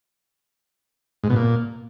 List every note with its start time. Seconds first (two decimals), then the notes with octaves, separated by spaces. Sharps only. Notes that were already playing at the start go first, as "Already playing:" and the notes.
1.24 G#2
1.30 B2
1.36 A#2